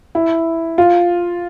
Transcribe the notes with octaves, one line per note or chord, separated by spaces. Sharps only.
E4
F4